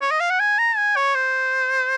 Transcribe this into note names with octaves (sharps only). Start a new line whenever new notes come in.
C#5
D#5
F5
F#5
G#5
A#5
G#5
C#5
C5